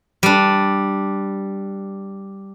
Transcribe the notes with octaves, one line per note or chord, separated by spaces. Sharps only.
G3 D4